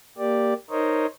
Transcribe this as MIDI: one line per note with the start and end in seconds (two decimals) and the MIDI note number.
0.18 0.54 58
0.18 0.54 67
0.18 0.54 74
0.70 1.06 63
0.70 1.06 70
0.70 1.06 72
0.70 1.06 73
0.70 1.06 75